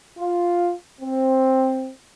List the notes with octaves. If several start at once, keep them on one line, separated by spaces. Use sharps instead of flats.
F4
C4